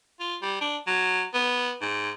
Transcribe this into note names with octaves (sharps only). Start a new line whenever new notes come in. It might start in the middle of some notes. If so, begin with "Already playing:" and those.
F4
G3
D4
F#3
B3
G#2